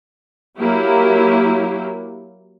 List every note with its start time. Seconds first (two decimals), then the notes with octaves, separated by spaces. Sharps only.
0.60 F#3 A#3 E4 G4